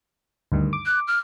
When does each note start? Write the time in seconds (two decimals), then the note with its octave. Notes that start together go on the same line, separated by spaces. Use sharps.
0.52 D2 G2 D#3
0.73 D6
0.86 F#6
1.08 F6